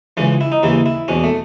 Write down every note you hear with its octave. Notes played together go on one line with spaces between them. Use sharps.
C#2 C#3 E3 C#4
E4
D#4
D#2 C#3 E3 E4
E4
E2 B2 C#4
A3